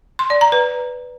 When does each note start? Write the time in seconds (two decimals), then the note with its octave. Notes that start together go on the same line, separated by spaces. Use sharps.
0.19 C6
0.30 D5
0.41 A#5
0.52 B4